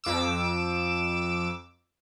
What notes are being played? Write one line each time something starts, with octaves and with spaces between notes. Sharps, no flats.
F2 D6 E6